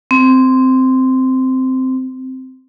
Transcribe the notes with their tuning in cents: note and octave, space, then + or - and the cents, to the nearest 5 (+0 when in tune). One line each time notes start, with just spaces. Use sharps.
C4 -10